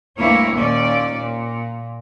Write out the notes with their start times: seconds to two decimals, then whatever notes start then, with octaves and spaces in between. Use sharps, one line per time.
0.18 D2 G2 A#3 E4 C#5
0.56 D#2 A#2 C#4 D5
1.14 A#2